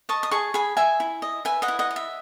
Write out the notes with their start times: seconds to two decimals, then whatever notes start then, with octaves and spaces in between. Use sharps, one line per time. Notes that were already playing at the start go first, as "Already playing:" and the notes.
0.09 D#5 A5 C#6
0.23 D#6
0.31 G#4 A5 C#6
0.54 G#4 G#5 B5
0.77 G#4 E5 G#5
1.00 E4
1.22 D#5
1.45 B4 E5 G#5
1.62 D#5 F#5
1.68 E4
1.79 D#5 F#5
1.91 D#5
1.96 E5